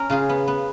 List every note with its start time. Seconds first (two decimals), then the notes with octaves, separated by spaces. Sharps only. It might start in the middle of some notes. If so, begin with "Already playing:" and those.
Already playing: C#4 A#4
0.10 C#3 F4 G#4
0.29 B3
0.48 B3